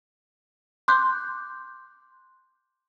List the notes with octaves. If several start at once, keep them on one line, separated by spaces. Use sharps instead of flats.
C6 D6 F#6 G6